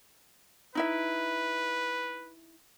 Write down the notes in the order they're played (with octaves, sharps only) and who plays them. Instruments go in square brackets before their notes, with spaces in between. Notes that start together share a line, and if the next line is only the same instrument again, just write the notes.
[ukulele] D#4 E4 E5 [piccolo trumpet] B4